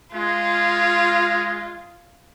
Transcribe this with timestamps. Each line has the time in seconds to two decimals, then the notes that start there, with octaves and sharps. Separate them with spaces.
0.14 G#3 F4